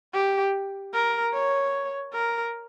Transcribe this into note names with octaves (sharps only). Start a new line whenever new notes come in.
G4
A#4
C#5
A#4